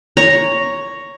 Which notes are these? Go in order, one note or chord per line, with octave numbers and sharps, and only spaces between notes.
C#5 A#5